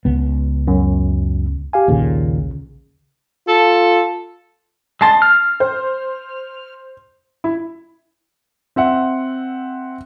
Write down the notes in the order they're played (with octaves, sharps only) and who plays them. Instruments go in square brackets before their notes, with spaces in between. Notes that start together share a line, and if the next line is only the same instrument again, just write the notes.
[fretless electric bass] C#2 B3
[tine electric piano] F#2
G4 F5 G#5
[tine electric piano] A#1 C#3 [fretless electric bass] D#2 A#2
[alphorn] F4 [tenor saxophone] A4
[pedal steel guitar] G#3 A5 C6 [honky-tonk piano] A6 C7
[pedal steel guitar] F6
[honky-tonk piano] C5
E4
[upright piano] C4 E5 F#5